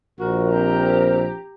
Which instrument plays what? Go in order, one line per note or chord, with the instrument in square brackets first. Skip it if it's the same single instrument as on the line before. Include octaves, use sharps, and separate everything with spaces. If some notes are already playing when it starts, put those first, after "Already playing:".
[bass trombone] A#1 [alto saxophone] F#4 [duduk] A#4
[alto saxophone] C4 [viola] G4 A#5